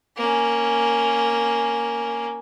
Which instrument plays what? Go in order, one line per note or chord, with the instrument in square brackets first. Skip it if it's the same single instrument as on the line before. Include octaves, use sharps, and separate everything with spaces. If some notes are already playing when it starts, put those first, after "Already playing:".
[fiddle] A#3 C#4